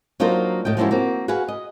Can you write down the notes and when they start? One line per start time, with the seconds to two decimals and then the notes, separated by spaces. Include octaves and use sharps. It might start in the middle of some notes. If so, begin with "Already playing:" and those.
0.20 F#3 A#3 D4 D#4 F4 C5
0.65 A2 D#5 G5
0.77 F3 G#3 A#3 C#4 E4 F#4
0.91 A#3 C4 F#4
1.28 F#4 G#4 B4 F5 F#5
1.48 D#5